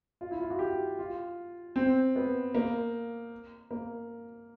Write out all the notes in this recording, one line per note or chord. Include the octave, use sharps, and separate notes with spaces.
F4
E4
F4
F#4
G4
F4
C4
B3
A#3
A#3